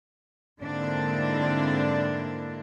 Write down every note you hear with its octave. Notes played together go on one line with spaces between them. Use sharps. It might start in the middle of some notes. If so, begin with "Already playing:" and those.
G#2 D3 A#3 C4 D4 E4